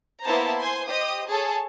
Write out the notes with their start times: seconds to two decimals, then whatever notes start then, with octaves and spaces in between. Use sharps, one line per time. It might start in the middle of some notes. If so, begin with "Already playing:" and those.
0.22 A#3 B3 E4 C5 A5 A#5
0.58 C5 G#5 C6
0.86 G4 C5 D#5 D#6
1.27 G#4 A4 C#5 A5